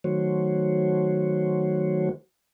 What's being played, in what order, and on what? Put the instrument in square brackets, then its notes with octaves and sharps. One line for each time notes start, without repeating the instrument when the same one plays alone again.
[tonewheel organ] D#3 F#3 A3 F#4 C5 C#5